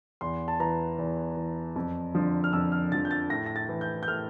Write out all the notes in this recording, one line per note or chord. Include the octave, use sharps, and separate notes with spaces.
E2 C6
A5
E3 A#5
E2
E3
F2
D3 F3
F6
F2 E6
F6
D3 F3 A6
G6
A6
A2 A#6
A#6
A6
E3
G6
G6
A2 F6